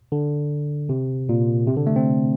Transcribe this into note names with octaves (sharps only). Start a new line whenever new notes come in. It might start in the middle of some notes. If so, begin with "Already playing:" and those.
D3
C3
A#2
C3
D3
A3
C4